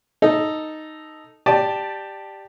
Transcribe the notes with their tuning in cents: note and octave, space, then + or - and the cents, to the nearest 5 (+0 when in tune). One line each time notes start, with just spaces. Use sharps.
D#4 +0 A4 +0
G4 +0 D5 +15 A5 +0